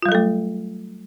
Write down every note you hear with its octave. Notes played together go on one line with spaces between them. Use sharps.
F#3 G3 A3 F4 A4